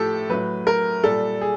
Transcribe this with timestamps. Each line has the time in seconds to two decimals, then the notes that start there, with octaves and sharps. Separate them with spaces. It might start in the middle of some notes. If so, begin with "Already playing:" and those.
Already playing: A2 F3 G4 A4
0.29 A2 F#3 B4
0.67 A#4
1.03 A#2 G3 A4
1.41 G#4